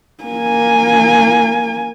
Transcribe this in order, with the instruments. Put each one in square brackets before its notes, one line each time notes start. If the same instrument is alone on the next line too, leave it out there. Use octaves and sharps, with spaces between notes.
[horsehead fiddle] A#3 G#5